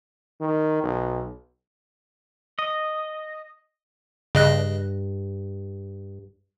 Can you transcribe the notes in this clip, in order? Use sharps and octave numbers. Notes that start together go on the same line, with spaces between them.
D#3
B1
D#5
G2 C#3 D#5 F#6